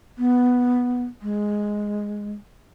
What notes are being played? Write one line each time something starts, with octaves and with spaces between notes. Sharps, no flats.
B3
G#3